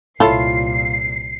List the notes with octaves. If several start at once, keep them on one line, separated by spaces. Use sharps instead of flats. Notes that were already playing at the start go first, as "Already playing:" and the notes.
C2 A#2 E4 F4 A4 C#5 C7